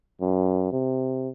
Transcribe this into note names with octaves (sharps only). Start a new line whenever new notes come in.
F#2
C3